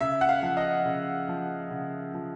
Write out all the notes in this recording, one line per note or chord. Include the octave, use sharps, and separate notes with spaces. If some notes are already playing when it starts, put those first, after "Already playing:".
C#3 E5
F#5
F5
F3
D#5
C#3
F3
C#3
F3